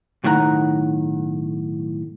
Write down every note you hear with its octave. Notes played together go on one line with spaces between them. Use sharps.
B1 A2 D#3 E4 F#5 A#5